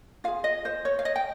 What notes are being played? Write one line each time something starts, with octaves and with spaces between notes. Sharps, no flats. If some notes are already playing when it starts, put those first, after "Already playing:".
F4 G#4 F5
D#5
C5
C#5
F5
D#5
G5